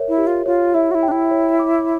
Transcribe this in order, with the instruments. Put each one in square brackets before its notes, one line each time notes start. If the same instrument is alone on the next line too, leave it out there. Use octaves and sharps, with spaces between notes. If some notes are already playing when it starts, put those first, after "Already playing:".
Already playing: [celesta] A#4 C#5 E5
[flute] E4
[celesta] G4
[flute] F4
[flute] F4 [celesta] C#5
[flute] E4 [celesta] E5
[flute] F#4
E4
[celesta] G5
[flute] D4
E4
[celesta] C#5
D6